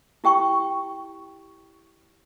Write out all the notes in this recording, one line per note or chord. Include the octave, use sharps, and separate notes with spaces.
E4 G4 G5 C#6